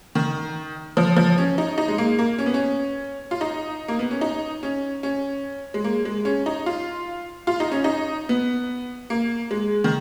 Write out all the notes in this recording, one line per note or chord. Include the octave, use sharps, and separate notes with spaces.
D#3
F3
F3
C#4
D#4
D#4
G#3
A#3
A#3
C#4
B3
C#4
F4
D#4
A#3
B3
C#4
D#4
C#4
C#4
G#3
A#3
G#3
C#4
D#4
F4
F4
D#4
C#4
D#4
B3
A#3
G#3
D#3